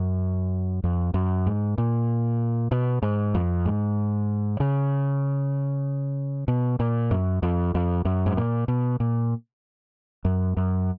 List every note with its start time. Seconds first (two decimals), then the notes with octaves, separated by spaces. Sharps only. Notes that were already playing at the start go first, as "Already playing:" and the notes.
Already playing: F#2
0.84 F2
1.14 F#2
1.46 G#2
1.78 A#2
2.71 B2
3.02 G#2
3.35 F2
3.66 G#2
4.60 C#3
6.48 B2
6.80 A#2
7.11 F#2
7.43 F2
7.75 F2
8.05 F#2
8.26 G#2
8.37 A#2
8.68 B2
9.00 A#2
10.25 F#2
10.57 F#2